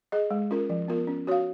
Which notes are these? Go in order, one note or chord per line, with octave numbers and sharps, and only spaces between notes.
G#4 D#5
G#3
C#4 F4 A#4
F3
B3 F4 A#4
C#4
F#4 C#5 F5